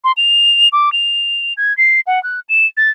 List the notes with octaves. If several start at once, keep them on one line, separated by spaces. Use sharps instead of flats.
C6
F7
D6
F7
G#6
C7
F#5
F#6
E7
A6